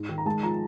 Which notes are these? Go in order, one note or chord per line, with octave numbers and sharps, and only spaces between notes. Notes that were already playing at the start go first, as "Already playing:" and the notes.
Already playing: G#2
D#3
A#5
G#3 A5
F3 A#5